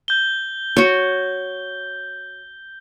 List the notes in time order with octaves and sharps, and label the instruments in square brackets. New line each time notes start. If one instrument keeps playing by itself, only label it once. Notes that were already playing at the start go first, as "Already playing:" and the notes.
[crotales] G6 G7
[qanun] F#4 C#5